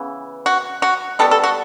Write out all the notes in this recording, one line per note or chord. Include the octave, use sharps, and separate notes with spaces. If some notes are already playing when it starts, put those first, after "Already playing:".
Already playing: C#3 E3 B3
F#4
F#4
B2 G3 B3 A4
A4
F#4